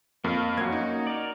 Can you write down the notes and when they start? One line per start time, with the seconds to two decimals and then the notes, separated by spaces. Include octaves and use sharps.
0.24 F2 A#3 F5
0.57 F#2 A#3 C#4 F#4 G#6
0.72 D#4
1.07 A#4 D5